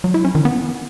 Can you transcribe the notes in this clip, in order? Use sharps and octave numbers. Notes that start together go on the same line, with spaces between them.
F#3
E4
C#4
D#3
B3